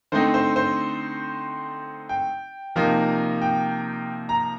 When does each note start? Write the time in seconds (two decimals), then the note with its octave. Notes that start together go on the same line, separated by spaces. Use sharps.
0.12 D3 A3 C4 D#4 C5
0.34 C5
0.56 C5
2.09 G5
2.76 C3 F3 A#3 D#4
3.42 G5
4.29 A#5